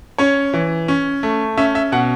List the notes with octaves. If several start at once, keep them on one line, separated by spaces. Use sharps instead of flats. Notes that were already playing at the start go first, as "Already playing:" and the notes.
C#4 C#5
E3
C#4
A3
C#4 E5
E5
B2 F#5